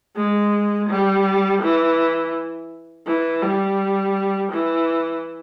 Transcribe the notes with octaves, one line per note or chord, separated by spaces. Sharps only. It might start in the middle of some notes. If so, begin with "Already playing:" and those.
G#3
G3
E3
E3
G3
E3